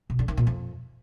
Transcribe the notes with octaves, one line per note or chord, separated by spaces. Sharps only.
B2
D3
D#3
A#2
F2